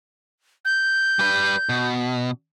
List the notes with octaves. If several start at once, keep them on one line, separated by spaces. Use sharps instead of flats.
G6
G3 B4
B2